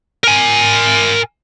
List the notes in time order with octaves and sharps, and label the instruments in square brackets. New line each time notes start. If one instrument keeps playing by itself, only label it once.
[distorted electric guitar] A#4 G#5